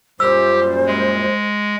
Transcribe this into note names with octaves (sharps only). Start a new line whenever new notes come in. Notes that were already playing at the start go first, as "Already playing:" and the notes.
F#2 A#2 G3 G4 C5 E6
G#3